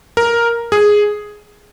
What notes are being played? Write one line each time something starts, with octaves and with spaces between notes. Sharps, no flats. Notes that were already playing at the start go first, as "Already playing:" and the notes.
A#4
G#4